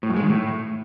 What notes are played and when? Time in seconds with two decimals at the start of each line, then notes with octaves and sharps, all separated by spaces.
0.03 A2
0.10 F#2
0.16 G#3
0.23 D#3
0.29 A2